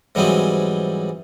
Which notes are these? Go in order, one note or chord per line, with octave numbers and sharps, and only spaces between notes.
G#2 E3 F#3 G3 C4 G#4